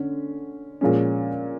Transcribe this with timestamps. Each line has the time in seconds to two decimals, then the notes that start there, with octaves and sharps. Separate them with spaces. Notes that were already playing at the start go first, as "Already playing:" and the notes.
Already playing: D3 C#4
0.81 A#2 F3 G#3 C#4